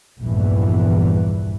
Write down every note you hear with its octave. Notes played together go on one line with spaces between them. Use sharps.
A#1 E2 G2 E3